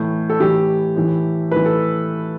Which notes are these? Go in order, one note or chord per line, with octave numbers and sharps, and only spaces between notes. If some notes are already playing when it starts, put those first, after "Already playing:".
Already playing: A2 E3
A4
A2 E3 G4
A2 E3
A2 E3 B4
A4